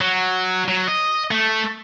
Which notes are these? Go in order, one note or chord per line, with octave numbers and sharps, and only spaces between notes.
F#3
F#3
D#5
A3